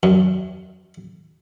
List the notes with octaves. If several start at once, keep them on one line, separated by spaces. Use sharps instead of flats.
F#2